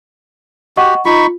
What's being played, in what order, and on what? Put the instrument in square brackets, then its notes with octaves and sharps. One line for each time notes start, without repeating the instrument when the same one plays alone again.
[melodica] F#4 G4 [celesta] D#5 F#5 C#6
[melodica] D#4 B5 C#6 [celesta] F4